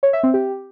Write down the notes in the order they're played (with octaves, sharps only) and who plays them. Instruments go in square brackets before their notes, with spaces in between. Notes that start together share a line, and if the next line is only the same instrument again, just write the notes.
[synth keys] C#5
E5
C4
G4